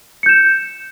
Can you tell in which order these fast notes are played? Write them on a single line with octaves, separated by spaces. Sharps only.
C#7 G6 E7